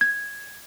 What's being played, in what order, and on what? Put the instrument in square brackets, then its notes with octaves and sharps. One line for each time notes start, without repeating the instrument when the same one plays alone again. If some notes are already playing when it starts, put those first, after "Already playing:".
[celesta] G#6